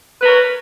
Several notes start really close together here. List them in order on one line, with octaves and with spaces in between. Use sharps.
B4 A#4 C#5